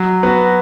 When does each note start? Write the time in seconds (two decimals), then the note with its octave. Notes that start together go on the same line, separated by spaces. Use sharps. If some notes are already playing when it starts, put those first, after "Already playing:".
Already playing: F#3
0.23 B3 F#4